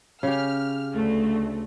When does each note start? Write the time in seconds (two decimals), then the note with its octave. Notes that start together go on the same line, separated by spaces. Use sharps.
0.23 C#3 G4 F6
0.94 D2 A3